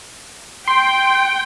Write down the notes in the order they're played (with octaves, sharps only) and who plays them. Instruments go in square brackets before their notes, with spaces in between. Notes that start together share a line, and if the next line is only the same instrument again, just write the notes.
[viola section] G5 [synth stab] C6